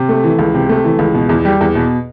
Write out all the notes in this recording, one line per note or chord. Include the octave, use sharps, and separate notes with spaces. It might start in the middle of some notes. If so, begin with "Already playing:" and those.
Already playing: C3
A3
E3
C#2
C3
A3
E3
C#2
B2
E2
G3
E2
B2